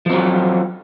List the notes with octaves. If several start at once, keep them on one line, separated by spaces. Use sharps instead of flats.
F3 F#3 C4